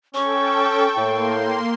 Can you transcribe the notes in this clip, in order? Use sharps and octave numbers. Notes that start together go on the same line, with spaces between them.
C#4 A4 G5 C#6
A2 A#3 G5 C6